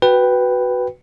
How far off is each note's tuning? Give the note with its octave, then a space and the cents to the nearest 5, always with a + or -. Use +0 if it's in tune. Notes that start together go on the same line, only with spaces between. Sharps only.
F#4 +0 B4 +0 G5 +0